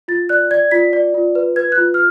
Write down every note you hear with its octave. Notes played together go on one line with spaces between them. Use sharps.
F4 A6
D5 F#6
D5 G#6
F4 B6
D5
F4
B4
B4 G#6
F#6
F4
F6